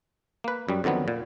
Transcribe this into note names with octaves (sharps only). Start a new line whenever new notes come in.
A#3 B4
F#2 G3
F2 D3 D#3 F#3 B3
A#2